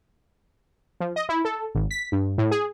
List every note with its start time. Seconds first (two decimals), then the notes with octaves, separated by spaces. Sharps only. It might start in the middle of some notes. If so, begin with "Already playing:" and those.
1.00 F3
1.16 D#5
1.29 E4
1.45 A4
1.75 G#1
1.91 B6
2.12 G2
2.38 A2
2.51 G#4